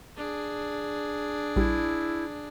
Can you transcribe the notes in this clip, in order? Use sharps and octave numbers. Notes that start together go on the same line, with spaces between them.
D4 G#4
A#1 G3 E4